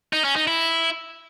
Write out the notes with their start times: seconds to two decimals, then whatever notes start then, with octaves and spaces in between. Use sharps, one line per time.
0.13 D#4
0.24 C#4
0.36 D#4
0.47 E4